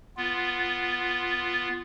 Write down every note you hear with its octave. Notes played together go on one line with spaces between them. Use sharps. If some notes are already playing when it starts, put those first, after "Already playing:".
B3 F4